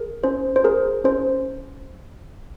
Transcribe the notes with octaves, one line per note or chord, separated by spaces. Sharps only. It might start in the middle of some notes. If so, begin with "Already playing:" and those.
Already playing: G#4 A#4
C#4 C5
C5
G#4 A#4
C#4 C5